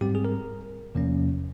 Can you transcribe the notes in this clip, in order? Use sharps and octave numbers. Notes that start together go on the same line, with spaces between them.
G#2 G3 C4 G4
G#4
A#4
E2 C3 F3 A#3 C#4